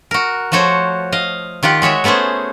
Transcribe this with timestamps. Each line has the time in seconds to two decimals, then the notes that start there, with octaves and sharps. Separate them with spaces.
0.11 F#4 A#4
0.52 F3 A3 F#4 C5 C#5
1.12 D#5 F5
1.63 D#3 F4 G4 F#5
1.82 G#3 F#4 C#5 E5
2.04 A3 B3 C#4 G#4 C5